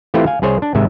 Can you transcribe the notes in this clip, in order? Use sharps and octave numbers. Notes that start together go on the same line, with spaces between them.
E3 A3 C4 E4 F4 G4
F5 G#5
C2 G#4 C5 C#5
D4
G#1 G#2 C3 G#3 E5